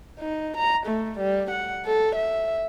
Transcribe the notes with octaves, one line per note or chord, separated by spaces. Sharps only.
D#4
A#5
A3
G3
F#5
A4
E5